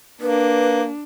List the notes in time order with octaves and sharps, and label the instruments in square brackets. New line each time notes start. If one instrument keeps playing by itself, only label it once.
[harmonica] A#3 [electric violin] D4 [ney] B4